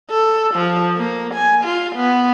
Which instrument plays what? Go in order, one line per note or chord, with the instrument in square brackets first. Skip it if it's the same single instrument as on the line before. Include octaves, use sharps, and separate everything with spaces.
[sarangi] A4
F3
A#3
G#5
F4
B3